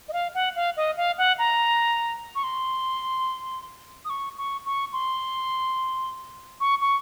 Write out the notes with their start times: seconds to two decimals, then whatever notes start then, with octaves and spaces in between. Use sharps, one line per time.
0.09 D#5
0.13 F5
0.34 F#5
0.56 F5
0.77 D#5
0.97 F5
1.18 F#5
1.39 A#5
2.35 C#6
2.44 C6
4.05 D#6
4.10 C#6
4.38 C#6
4.66 C#6
4.93 C6
6.60 C#6
6.81 C#6